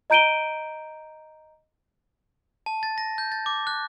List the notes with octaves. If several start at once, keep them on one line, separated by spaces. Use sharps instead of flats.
D#5 A#5 G6 D7 D#7 G7
A5
A6
A#6
G6
A6
D6
F#6